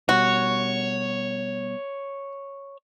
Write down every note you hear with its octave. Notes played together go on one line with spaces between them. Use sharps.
B2 G3 F#4 C#5